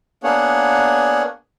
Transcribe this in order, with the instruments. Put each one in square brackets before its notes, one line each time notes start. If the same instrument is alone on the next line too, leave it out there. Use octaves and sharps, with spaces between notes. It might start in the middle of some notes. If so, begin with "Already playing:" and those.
[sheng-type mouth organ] A#3 B3 D4 G#4 C#5 F#5